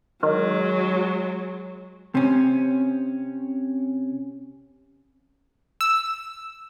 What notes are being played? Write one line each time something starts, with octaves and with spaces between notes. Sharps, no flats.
D#3 F#3 G#3
C3 C#4
E6